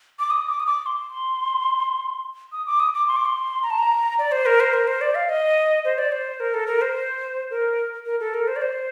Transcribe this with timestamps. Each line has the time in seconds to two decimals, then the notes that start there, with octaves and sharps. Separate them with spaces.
0.19 D6
0.30 D#6
0.48 D6
0.60 D#6
0.67 D6
0.86 C6
2.52 D#6
2.66 D6
2.80 D#6
2.94 D6
3.08 C6
3.16 D6
3.25 C6
3.63 A#5
3.70 A5
3.78 A#5
4.19 D5
4.32 C5
4.46 A#4
4.60 C5
4.73 A#4
4.87 C5
5.01 D5
5.15 F5
5.29 D#5
5.85 C5
5.98 D5
6.12 C5
6.40 A#4
6.54 A4
6.67 A#4
6.82 C5
7.50 A#4
8.06 A#4
8.20 A4
8.34 A#4
8.48 C5
8.56 D5
8.62 C5